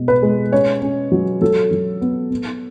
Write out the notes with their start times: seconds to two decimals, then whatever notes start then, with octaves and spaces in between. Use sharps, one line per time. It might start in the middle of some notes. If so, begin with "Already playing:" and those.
Already playing: B2 G#3
0.08 B4
0.22 G#3
0.52 C#4 C#5
0.82 C#4
1.12 F#3
1.41 F#3 A4
1.71 F#3
2.01 B3
2.31 B3